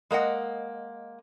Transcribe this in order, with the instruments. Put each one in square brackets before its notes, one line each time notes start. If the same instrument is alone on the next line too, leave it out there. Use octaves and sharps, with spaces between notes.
[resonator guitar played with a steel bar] G#3 A#3 D#5 F#5